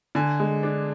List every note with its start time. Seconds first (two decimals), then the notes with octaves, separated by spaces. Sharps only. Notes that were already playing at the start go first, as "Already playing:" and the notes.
0.15 D3 G#5
0.40 G#3
0.63 D4